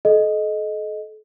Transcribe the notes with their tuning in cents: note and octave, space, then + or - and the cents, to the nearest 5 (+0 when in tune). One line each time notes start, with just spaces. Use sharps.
A4 -40 D#5 +0